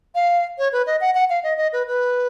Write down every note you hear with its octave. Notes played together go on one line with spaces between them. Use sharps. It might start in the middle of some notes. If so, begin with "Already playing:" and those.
F5
C#5
B4
D#5
F#5
F#5
F5
D#5
D#5
B4
B4